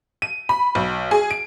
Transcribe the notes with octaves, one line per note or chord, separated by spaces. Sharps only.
D#7
B5
B1
G#4
D7